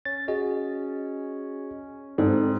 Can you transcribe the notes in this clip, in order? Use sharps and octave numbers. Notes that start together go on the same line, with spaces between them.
C#4 A6
F#4 G#4 D#5
G#2 C4 A4 D5